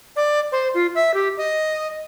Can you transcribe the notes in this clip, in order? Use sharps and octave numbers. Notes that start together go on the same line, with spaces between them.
D5
C5
F4
E5
G4
D#5